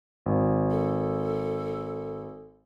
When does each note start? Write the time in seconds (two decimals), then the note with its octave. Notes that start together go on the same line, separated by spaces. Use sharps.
0.26 G#1
0.71 A4